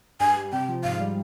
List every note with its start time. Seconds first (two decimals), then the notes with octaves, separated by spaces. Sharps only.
0.20 G2 G#5
0.36 G3
0.52 C3 G5
0.69 F3
0.83 G#2 F5
1.00 G3